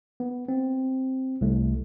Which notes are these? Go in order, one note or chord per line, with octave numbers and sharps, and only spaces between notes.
B3
C4
C2 A3